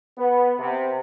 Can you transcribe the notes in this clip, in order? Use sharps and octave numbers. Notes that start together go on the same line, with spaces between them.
B3
C3